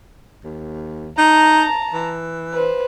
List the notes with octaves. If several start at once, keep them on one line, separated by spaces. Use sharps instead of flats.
D#2
D#4 A5 A#5
E3
B4 C5